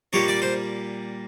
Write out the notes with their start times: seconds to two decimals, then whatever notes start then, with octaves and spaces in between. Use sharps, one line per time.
0.13 A#2 G3 A#3 C#5
0.28 D5
0.42 C5